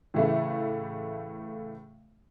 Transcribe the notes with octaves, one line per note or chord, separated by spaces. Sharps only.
A2 C#3 E3 A3